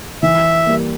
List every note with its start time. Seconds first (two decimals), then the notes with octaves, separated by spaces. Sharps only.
0.23 E3 E5
0.66 G3 A#3